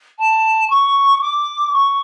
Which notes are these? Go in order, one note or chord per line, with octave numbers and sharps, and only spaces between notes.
A5
C#6
D6
C#6